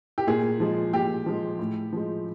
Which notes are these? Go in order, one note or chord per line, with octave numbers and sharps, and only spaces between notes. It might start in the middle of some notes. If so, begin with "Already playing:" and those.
G4
A#2 G#4
F3 G#3
A#2 G4
F3 G#3
A2
F3 G#3